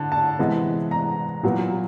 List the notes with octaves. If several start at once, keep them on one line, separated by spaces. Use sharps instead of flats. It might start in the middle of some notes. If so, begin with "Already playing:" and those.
Already playing: D3 A5
A5
C3 E3 G#3 B3
A#5
A#2 F#3 B3